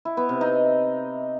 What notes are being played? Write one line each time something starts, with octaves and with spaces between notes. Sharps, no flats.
E4
B3
C3
D#4